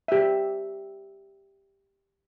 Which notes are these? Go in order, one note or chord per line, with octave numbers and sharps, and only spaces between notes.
G4 E5